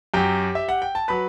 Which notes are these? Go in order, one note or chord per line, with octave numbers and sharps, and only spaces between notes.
F#2 F#3 G4 G5
E5
F#5
G5
A5
F#3 B4 B5